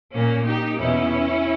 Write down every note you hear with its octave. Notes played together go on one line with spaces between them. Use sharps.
A#2 A#3 C#4
D#4 G4
E2 B2 C#4 E4